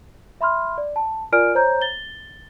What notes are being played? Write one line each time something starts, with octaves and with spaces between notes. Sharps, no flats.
E5 B5 C6 F6
D5
A5
F4 A#4 D5 G#5 F6 D7
C5 C#5 A#5 G6
A6 G7